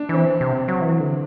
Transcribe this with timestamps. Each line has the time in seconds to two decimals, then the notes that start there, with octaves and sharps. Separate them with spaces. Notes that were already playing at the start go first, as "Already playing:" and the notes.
Already playing: D4
0.09 E3 C4
0.41 C3
0.68 F#3
0.82 E3
1.00 D3